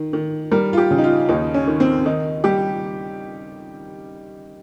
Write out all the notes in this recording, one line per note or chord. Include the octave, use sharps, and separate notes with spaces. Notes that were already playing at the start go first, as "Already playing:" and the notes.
Already playing: D#3
D#3
G3 A#4
F4
G4
C#3
D#4
F4
D#2 D#4
C#4
D#3
C4
D#3 D#4
G3 G4